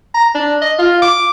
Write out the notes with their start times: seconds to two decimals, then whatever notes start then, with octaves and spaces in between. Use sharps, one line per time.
0.14 A#5
0.35 D4
0.61 D#5
0.78 F4
1.02 D6